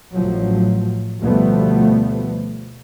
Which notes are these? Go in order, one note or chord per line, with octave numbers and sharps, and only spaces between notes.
A1 F3 F#3
D2 B2 F3 G3 A3 B3